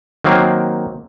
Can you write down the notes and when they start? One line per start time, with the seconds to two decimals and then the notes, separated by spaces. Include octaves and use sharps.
0.24 D#3 F#3 A#3 C4